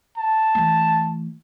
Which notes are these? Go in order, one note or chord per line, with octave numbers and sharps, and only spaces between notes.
A5
E3 A3